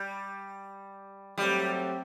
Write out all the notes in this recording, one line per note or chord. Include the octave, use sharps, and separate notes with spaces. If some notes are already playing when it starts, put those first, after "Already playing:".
Already playing: G3
F#3 G3 A3 C4 G4